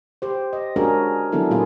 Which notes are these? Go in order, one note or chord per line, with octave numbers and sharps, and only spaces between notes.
G4 C5
D#5
G#3 C#4 D4 F#4 G#4 A#4
D#3 F#3 B3 D4 E4 A4
A#2 F#3 A#3 F4 G#4